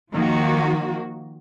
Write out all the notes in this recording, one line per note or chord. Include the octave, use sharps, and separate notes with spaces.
D#3 F3 A#3 F#4